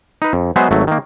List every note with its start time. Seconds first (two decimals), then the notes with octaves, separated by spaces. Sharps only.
0.22 D#4 B4
0.33 F2
0.56 F#3 G#3 B3 G#4 C5 E5
0.71 G#1 F#3 A3
0.87 D#3 A#3